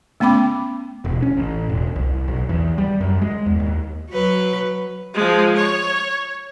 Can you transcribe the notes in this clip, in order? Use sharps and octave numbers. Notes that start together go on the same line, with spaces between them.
A3 B3 C#4 G5 B5 D6
E1
C#4
A1
E1
C2
B1
E2
G3
F#2
G#3
E2
D#2
F#3 B4
F3 G#3
C#5